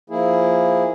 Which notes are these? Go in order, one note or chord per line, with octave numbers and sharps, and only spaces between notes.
F3 A#3 E4 G#4